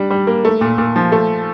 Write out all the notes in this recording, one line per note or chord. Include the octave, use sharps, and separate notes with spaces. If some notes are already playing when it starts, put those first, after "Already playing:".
Already playing: G3 D4
G3
A#3
A3
A#2
A#2
F3
A3